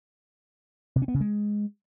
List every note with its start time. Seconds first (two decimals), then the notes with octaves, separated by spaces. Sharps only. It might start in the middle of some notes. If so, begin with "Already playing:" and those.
0.96 C3
1.02 C#4
1.08 B3
1.14 C#3
1.20 G#3